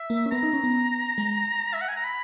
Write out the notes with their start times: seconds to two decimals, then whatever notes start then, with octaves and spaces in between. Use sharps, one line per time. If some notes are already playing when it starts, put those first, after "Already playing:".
Already playing: E5
0.10 A#3
0.26 C#4
0.31 B3 A#5
0.43 D#4
0.53 C#4
0.64 B3
1.18 G#3
1.73 E5
1.81 F#5
1.88 G#5
1.97 A#5
2.04 B5